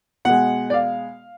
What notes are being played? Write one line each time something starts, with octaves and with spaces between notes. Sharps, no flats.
B2 G#3 F#5
D5
F5